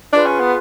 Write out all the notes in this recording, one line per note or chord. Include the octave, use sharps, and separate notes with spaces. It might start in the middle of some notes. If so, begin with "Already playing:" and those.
D4 F4 G#4 B4
C#4
B3